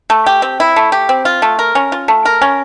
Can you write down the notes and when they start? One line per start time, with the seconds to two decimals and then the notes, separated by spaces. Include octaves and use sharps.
0.10 A3
0.26 G4
0.42 C4
0.60 E4
0.76 A3
0.92 G4
1.09 C4
1.25 F4
1.42 A3
1.59 A#4
1.75 C#4
1.92 F4
2.08 A3
2.25 A#4
2.42 C#4